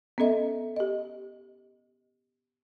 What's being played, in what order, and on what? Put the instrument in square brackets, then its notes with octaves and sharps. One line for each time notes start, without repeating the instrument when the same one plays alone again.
[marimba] B3 C#4 A4 D#5 E5
G4 D#5